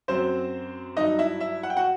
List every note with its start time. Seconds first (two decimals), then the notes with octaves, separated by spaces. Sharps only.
0.08 F#2 F#3 C4 C5
0.97 G2 F#3 D#4 D#5
1.19 E4 E5
1.41 E4 E5
1.63 F#5
1.70 G5
1.77 F#4 F#5